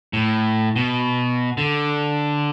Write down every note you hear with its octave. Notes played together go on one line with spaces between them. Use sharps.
A2
B2
D3